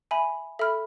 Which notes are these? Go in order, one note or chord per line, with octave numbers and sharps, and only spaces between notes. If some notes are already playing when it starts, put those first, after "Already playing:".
E5 G#5 B5
A4 E5 B5 F6